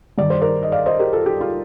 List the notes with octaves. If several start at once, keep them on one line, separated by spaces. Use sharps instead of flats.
G2 D#3 G3 D5
C5
A#4 D5
D#5
D5 F5
C5 D#5
G4 A#4
F4 A4
G4
F4